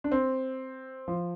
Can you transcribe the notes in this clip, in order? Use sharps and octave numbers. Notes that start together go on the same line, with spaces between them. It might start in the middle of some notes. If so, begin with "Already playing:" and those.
D4
C4
F3